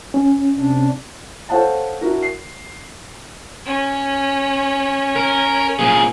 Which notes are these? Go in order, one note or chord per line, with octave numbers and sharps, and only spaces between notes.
C#4
C3 D4
A4 C5 C#5 F5 F#5 A5
D4 E4 F#4 A#4
C7
C#4
A#4
A#2 G#4